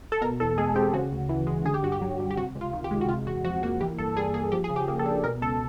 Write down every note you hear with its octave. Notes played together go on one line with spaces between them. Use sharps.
A4
B2 A#4
E2 A4
G#3 G#4
C4 G4
C#3 F#4
D2
E3
G#3
D3 G#4
G4
G2 F#4
G4
F#3
G2
G4
C3 F#4
C#2
F4
D#3
G4
G#3
F#4
C3 F4
E2 F#4
F3 F#4
A#3 F#4
E3 G4
G2 A4
G3 G#4
A#3 G#4
F3 G4
G#4
C#3
G4
A#3
A4
D4
B2 A#4
C#2 A4